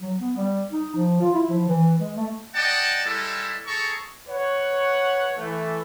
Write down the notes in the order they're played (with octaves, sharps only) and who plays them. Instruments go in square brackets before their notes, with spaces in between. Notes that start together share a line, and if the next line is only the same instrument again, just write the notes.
[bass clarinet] F#3
B3
G3
D#4
F3
F4
E4
F3
E3
G#3
A3
[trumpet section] D5 D#5 F#5 G5 A5
G3 G#3 E4 A4
G#4 A4 A#5 C#6
[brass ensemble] B4 C#5 F#5
E3 A3